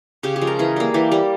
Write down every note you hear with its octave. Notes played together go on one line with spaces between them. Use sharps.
C#3 G4
G4
F3 G#3
A#4
E3 G#4
G3 A#3
E3 G4
G3 A#3